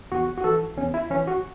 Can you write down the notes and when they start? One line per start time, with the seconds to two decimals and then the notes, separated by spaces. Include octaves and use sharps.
0.12 E2 F#4
0.38 F#4
0.44 E3 A4
0.77 E2 C#4
0.94 E4
1.10 E3 C#4
1.27 F#4